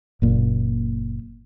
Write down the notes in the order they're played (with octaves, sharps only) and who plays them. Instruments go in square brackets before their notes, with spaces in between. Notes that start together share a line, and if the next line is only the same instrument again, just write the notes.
[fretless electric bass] F#1 A#2